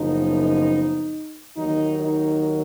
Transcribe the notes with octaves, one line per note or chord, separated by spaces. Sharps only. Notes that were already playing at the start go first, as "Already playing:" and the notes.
Already playing: F#1 F#2 F3 B3 D#4
D#2 D#3 F#3 A#3 D#4
D#4